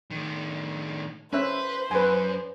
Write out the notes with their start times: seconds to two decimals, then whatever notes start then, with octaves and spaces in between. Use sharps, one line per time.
0.11 A2 D#3
1.33 C#4 B4 C5 E5
1.91 F#2 B4 G#5